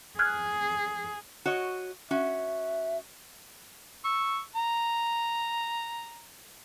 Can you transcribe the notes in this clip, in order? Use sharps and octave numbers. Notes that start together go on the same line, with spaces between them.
G#4 F6 F#6 G#6
F#4 C#5 D#5
C#4 F#4 E5
C#6 E6
A#5